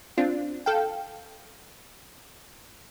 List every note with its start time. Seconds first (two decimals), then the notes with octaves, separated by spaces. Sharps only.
0.18 C4 D4 F4
0.66 A4 F5 G5